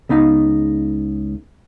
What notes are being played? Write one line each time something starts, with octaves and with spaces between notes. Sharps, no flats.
C#2 B3 D#4 F5